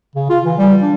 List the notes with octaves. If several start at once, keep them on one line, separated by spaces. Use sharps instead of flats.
C#3
F4
E3
G3
D4